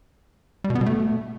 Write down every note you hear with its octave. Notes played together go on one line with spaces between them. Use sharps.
G3
B2
B3
B2
A3